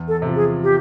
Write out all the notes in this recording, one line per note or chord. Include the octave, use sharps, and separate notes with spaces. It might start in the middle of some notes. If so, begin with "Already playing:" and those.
Already playing: E2
A4
C3 F3
G#4
G4